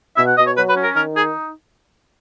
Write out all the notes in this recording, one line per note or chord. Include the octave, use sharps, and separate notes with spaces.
B2 E5
F#5
B2 D#5
C#5
F#3 B4
B4
C#4
A#4
D#3 A#4
D#4 G#4